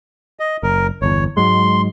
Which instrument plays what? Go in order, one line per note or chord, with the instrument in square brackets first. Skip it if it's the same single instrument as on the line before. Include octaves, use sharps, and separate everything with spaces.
[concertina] D#5
[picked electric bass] F#1 [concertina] A#4
[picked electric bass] G1 E2 [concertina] C#5
[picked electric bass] G#2 F#3 G#3 [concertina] C6